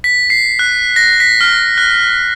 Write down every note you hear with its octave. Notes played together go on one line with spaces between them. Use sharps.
B6
C7
F#6
A#6
B6
F6
F#6